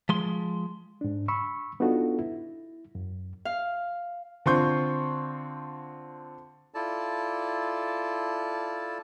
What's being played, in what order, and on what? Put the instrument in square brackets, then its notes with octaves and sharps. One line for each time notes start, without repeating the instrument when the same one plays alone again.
[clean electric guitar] F3 G#3 C6
[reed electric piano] G#2 D4
B5 C#6 E6
B3 D4 D#4 F4 F#4 A4
E4
F#2
[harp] F5
[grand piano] D3 C4 F4 C6 C#6 G6
[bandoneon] E4 F4 A4 D5 A5